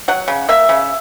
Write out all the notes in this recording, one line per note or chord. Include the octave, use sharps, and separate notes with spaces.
F#3 F#5
C#3
A#3 E5
C#3